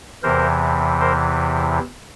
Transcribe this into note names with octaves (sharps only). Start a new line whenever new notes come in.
E2 C3 E3 A#4 C5
A#4 C5